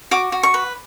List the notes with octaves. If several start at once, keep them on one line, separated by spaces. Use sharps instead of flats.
F#4 D6
F#4
C#6
B4